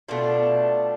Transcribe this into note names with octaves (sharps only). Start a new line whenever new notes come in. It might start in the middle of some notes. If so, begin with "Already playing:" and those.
B2 A3 D4 F4